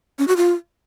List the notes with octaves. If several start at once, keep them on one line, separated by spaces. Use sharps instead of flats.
C#4
F#4
F4